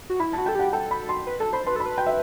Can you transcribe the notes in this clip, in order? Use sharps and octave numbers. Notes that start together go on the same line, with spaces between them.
F#4
E4 B5
F#4 A5
A4 G5
G4 F#5
A4 G5
B5
C6
B4
A4 A5
C5 B5
B4 C6
A4 B5
B4
G5
E5